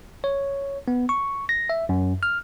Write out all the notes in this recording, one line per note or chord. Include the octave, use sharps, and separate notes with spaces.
C#5
B3
C#6
A#6
E5
F#2
F6